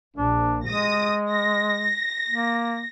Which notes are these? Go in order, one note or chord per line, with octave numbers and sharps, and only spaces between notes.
A#1 D4
G#3 D#6 A#6
A#6
A#3